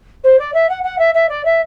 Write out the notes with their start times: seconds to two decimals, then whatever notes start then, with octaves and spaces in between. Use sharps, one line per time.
0.24 C5
0.39 D5
0.54 E5
0.69 F#5
0.84 F#5
0.99 E5
1.14 E5
1.29 D5
1.45 E5